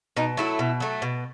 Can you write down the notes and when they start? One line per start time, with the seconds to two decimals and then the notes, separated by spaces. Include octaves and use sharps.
0.17 B2 D#4
0.37 F#3 A3 E4
0.59 B2
0.80 F#3 A3
1.02 B2